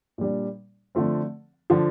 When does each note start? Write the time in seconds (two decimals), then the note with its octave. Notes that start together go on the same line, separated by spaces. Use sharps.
0.18 A#2 G3 D4
0.95 D3 F3 A3 C4
1.70 D3 F3